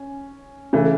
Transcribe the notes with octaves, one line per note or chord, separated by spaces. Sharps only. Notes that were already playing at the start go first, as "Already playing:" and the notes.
Already playing: C#4
C#3 E3 A3